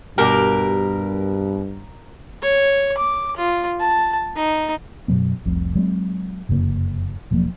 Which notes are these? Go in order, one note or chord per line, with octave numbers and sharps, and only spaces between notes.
G2 B2 G4 A#4
C#5
D6
F4
A5
D#4
F#2 B2 F#3 B3
F1 C2 F2
F#3 G#3 C4
F1 F#2 C#3 A#3
E1 F3 F#3 A#3